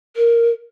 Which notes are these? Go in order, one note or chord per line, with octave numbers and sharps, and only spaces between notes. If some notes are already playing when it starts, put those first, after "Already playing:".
A#4